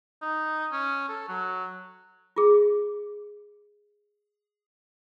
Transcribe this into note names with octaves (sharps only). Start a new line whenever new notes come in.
D#4
C#4
A4
F#3
F4 G#4